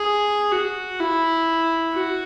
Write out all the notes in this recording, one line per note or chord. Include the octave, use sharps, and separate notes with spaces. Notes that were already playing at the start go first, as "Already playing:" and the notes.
Already playing: G#4
F#4
E4
F#4